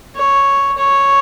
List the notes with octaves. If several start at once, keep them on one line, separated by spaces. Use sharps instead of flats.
C#5
C#5